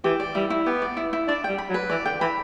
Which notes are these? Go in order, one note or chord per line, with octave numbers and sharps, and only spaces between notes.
E3 G4
D5
G3 E4
E4
B3 G4
D5
E4
E4
D4 D5
G3 G5
B5
F#3
B4
E3 D5
D3 G5
E3 B5